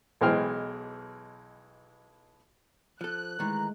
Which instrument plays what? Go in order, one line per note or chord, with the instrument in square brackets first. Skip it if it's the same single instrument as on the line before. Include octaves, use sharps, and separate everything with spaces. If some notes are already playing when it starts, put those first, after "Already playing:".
[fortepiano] B1 E3 G#3 C5 G5 F6
[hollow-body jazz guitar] F3 A4 [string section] F#6
[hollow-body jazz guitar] D#3 E3 [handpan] G#3 A3 [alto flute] A#5